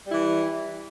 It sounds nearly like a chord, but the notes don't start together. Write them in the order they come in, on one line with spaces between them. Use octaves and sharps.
G3 E4 E3